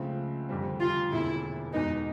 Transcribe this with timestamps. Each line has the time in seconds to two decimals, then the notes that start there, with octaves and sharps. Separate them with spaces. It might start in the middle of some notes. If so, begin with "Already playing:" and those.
Already playing: C#2 C#3 F3 A3 C4
0.49 F1 F2 D3 G3 C4
0.81 F4
1.12 E1 D#2 D3 E4
1.74 E2 B2 G#3 B3 D#4